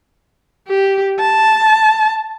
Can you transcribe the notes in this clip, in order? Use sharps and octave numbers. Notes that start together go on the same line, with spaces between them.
G4
A5